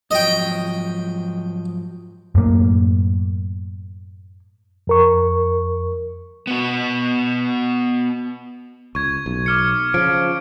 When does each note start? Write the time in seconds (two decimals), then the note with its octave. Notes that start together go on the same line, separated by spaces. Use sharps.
0.11 G#2 F3 F#3 D#5 G5
2.35 F#2 A2 A#3
4.87 F2 A#4 C#6
6.47 B3 F#4
8.95 C#2 C#6 G#6
9.26 B1
9.46 D6 F6 C#7
9.94 C#3 F3 D7